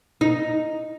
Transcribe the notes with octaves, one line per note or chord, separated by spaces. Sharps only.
D#4